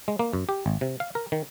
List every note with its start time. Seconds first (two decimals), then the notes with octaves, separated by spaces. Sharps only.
0.08 G#3
0.19 A#3
0.33 F#2
0.49 G4
0.66 G#1
0.81 C3
1.00 F5
1.15 A#4
1.32 D#3